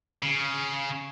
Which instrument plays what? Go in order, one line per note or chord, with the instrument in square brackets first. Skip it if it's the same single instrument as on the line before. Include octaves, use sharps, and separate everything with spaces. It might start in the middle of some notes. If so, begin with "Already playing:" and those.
[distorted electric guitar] C#3